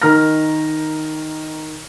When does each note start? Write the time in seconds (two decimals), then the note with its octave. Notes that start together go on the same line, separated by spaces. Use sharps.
0.02 D#3 D#4 A#4 A#5 F6 A#6